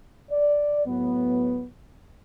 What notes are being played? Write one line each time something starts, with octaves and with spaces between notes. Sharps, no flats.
D5
A2 F#3 B3